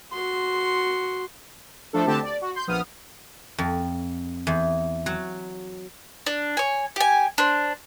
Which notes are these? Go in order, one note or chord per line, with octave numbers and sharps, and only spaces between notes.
F#4 C6
F3 A3 D4 A4
D2 D3 C4 G4 A5
D5
F#4
C6 G6
A#1 B3 D#6 F6
F2
E2
F#3
D4
C#5 G#5
G4 G#5
D4 C5